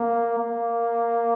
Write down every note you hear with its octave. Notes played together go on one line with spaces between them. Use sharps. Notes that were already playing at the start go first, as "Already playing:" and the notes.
Already playing: A#3
A#3